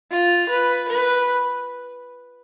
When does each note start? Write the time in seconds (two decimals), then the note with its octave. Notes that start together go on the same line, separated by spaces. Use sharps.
0.11 F4
0.50 B4
0.89 B4